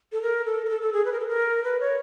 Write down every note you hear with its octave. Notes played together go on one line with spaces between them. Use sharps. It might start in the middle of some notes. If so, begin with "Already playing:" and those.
A4
A#4
A4
A#4
A4
A4
G#4
B4
A#4
A4
A#4
B4
C#5